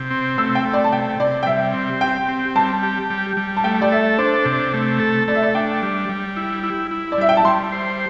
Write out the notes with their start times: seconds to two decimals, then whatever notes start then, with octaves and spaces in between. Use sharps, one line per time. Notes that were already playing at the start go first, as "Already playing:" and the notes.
Already playing: C3 G6
0.11 C4
0.38 A3 E6
0.55 G5
0.65 A3
0.73 D5
0.84 A5
0.92 C3 G5
1.20 C3 D5
1.43 G5
1.46 G3 E5
1.74 C4
2.01 G4 G5
2.28 C4
2.55 G3 A5
2.83 G4
3.10 G3
3.37 G3
3.57 A5
3.64 A3 G5
3.82 D5
3.91 A4 E5
4.18 D4 C5
4.45 C3
4.73 A3
5.00 A4
5.28 A3 D5
5.35 E5
5.42 D5
5.55 D4 G5
5.82 G3
6.09 G3
6.36 E4
6.63 E4
6.91 E4
7.12 D5
7.18 G3 E5
7.29 G5
7.37 A5
7.45 G3 C6
7.72 C5